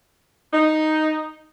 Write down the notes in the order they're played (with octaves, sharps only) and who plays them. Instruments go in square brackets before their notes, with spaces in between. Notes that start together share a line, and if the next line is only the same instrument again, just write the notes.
[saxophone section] D#4